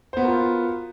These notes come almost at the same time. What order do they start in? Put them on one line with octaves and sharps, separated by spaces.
C5 B3 F#4 A#4 F4